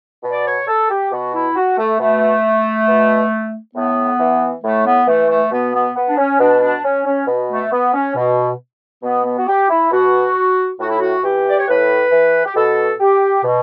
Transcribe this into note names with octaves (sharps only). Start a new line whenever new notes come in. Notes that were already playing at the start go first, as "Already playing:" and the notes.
B2
D5
C#5
A4
G4
B2 F#4
E4
F#4
A3
B2 A3
B2
A2 B3
E3
A2 A3
B3
E3 A3
A3
B2 B3
B3
B3
D4
C#4
B2 D4
D4
C#4
C#4
B2
A3
B3
C#4
B2
B2 B3
B3
F#4
G4
E4
B2 F#4
A2 F#4
E4
F#4
E3 G4
D5
C#5
A2 B4
E3
G4
B2 A4
G4
B2